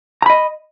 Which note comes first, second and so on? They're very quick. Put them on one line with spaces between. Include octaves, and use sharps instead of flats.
A#5 B5 D#5